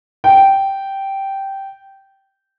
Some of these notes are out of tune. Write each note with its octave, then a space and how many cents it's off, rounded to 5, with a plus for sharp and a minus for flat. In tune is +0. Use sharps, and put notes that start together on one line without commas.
G5 -10